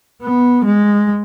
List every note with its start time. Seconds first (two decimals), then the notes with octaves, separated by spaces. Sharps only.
0.22 B3
0.65 G#3